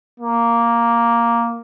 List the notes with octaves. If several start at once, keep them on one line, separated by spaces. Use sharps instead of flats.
A#3